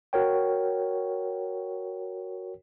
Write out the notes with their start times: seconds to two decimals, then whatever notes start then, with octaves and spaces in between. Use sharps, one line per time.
0.13 F#4 A#4 C#5 G5